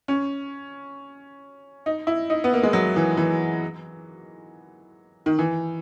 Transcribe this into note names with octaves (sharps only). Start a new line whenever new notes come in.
C#4
D#4
E4
D#4
B3
A#3
G#3
F#3
E3
E3
D#3
E3